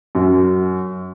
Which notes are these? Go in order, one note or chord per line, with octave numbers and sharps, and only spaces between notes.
F#2